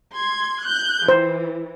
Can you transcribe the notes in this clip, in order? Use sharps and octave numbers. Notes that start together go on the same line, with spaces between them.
C6 G#6
F#6 G6
E3 C5